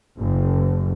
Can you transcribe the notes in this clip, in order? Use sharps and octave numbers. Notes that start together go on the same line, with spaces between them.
F#1